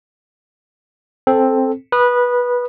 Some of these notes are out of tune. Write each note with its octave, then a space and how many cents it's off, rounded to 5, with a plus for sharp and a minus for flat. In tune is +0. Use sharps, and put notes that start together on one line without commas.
C4 +5 A4 -5
B4 -15 D#6 -25